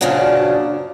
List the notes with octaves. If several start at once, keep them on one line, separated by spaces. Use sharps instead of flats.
F#2 A#2 C#3 F3 D4 F#4